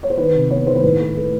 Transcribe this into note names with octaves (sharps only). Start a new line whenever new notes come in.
C#5
C5
D#3 B4
C3
B3 C#5
D#3 C5
B4
A2
A3
A3